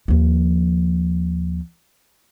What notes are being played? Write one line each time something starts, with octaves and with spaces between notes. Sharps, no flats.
D#2 F3